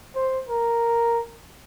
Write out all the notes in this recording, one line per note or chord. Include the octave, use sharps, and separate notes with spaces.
C5
A#4